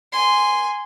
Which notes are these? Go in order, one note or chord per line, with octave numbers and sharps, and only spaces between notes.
G#5 C6